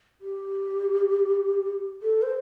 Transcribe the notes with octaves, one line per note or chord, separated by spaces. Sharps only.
G4
A4
C5